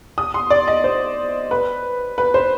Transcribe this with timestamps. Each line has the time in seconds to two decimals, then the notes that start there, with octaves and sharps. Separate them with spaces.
0.18 D#6
0.34 C6
0.50 D5
0.68 D#5
0.84 C5
1.51 B4
2.18 B4
2.34 C5